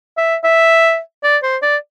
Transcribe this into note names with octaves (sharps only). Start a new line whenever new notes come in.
E5
E5
D5
C5
D5